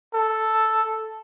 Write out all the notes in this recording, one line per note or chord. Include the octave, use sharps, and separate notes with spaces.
A4